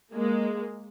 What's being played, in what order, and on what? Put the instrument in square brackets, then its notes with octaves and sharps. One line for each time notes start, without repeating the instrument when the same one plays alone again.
[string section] G#3 A#3